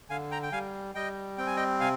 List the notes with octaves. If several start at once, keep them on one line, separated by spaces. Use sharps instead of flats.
D3 F5 G#5
G5 A#5
G5
G3 F5 G#5
G3 D#5 G5
C4 G5
G#5
D#5 G5
C3 F5 G#5